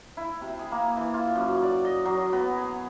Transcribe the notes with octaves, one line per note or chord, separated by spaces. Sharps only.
E4
C3
G#4
A#3
E3
F4
F#2
D5
D#5
F#3
B3
G#4